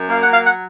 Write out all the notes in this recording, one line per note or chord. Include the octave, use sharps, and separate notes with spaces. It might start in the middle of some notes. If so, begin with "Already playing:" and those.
Already playing: F#2
A#3 F5
F#5
F#3
F5
F#5